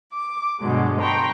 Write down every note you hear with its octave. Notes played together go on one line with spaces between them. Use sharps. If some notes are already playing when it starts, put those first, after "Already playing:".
D6
G2 B2 D3 F#3 G#3
B4 G5 A5 A#5 C6 C#6